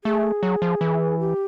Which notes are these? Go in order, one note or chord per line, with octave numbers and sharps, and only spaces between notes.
A3 G#4
F#3
F3
E3
G4